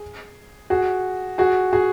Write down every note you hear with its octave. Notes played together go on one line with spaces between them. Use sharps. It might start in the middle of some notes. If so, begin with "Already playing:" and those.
Already playing: G#4
F#4 G#4
F#4 G#4
F#4 G#4